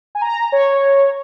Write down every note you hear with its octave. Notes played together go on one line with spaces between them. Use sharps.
G#5
A#5
C#5